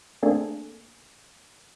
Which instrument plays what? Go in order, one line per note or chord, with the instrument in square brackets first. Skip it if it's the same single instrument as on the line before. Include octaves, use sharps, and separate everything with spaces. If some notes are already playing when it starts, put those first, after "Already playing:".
[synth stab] A3 A#3 C4 D4 G#4 A4